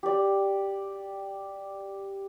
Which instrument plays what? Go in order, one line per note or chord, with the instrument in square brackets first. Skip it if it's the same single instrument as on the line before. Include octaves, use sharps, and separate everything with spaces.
[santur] G4 D5